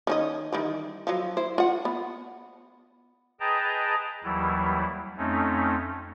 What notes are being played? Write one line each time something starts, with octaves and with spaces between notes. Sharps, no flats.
D#3 C#4 D#5
D#3 E3 G3
F3 F#3
E4 C5
F4 F#5
B3
G#4 B4 D#5 G5 A5 A#5
D#2 E3 F#3 G3 E4
F2 A3 C4 C#4 D#4